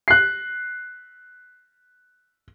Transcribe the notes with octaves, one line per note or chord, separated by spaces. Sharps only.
F#6 C7